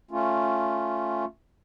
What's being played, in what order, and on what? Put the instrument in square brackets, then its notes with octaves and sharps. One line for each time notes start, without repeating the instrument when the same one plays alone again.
[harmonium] A3 C#4 F4